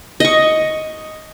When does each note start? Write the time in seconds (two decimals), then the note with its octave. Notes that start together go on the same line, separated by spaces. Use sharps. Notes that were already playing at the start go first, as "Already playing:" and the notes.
0.20 D#5 C#6